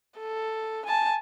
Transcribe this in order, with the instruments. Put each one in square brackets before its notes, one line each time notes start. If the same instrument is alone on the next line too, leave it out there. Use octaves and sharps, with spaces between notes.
[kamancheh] A4
G#5 A5